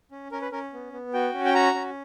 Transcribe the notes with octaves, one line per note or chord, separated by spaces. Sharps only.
C#4
C#4 A#4
B4
C#4 A#4
B3
B3
F#4 G5
C#4
G5
F#4 A#5
C#4